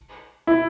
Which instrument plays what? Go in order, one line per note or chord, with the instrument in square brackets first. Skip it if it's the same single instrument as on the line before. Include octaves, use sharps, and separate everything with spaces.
[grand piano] E4